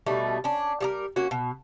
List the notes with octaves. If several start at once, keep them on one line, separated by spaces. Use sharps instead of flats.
B2 G3 A3 D#4
C#4 D4
G3 G4 A#4
A#3 C#4 F#4
B2